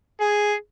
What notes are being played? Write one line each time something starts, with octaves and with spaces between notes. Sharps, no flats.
G#4